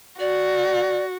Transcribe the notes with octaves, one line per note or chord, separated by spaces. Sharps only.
F#4 D5